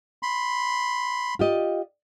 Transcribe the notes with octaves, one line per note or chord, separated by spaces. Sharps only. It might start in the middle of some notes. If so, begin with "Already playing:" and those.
B5 C6
F4 G4 D#5